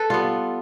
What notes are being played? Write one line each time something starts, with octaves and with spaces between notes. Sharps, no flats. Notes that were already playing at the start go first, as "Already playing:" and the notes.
Already playing: A4 B4
G3 B3 F4